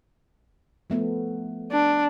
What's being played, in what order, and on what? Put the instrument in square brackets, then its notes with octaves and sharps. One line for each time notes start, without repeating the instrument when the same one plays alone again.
[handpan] F3 A3 B3
[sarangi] D4